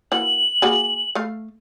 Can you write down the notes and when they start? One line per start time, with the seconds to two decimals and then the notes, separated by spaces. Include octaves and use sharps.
0.12 E3 A#3 F#4 F#7
0.62 A#3 F#4 G#4
1.15 A3 F5